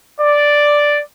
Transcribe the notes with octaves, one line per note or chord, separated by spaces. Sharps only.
D5